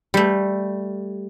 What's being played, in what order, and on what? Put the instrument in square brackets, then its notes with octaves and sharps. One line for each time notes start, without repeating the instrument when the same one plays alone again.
[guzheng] G3 A3